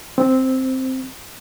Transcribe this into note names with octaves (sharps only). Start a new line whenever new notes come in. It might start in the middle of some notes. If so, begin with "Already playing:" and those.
C4